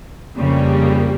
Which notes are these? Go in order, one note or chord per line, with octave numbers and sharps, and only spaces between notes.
F2 C#3 G3 A#3